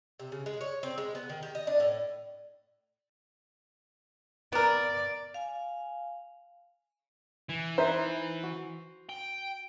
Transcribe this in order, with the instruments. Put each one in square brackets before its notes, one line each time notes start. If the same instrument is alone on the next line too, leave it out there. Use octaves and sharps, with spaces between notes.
[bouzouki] C3
C#3
G#3
C#5
C4
G#3
B3
D#3
G4
D#5
D4
A2
[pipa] B3 A#4 [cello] D5
[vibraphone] F5 G#5
[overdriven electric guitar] E3
[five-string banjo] D#4 B4 E5 [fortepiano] C5
[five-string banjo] F#4
[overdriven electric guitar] G5